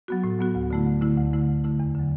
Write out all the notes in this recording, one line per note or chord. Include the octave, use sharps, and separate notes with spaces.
F#3 B3 F#4
A2
F#3 B3 F#4
D2
D3 A3 E4
D2
D3 A3 E4
D2
D3 A3 E4
D2
D3 A3 E4
E2
D3 F#3